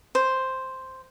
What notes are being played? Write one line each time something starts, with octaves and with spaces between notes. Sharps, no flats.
C5